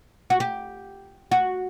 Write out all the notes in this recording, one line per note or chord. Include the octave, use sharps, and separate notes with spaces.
F#4
G4
F#4